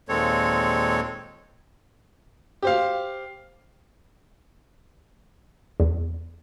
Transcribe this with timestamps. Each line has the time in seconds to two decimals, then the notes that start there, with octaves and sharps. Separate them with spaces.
0.09 D#2 A#2 G#3 C4 A4 C#5
2.62 G4 C5 F5
5.80 E2